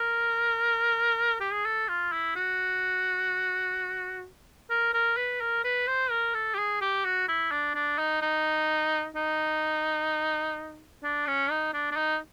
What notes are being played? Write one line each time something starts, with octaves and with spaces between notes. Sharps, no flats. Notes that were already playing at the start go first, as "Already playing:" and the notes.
Already playing: A#4
G4
G#4
A4
F4
E4
F#4
A#4
A#4
B4
A#4
B4
C5
A#4
A4
G4
G#4
G4
F#4
E4
D4
D4
D#4
D#4
D#4
D4
C#4
D#4
D4
D4
D#4